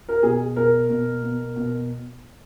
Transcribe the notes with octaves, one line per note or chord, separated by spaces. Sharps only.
A#4
B2 G#4
B2 A#4
B2
B2
B2